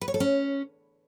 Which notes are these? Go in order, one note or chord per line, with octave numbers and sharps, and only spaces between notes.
B4
C#5
A4
C#4